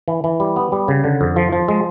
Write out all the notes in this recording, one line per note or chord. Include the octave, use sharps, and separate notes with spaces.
E3
E3
G3
B3
G3
C#3
D3
F2
F3
F3
G#3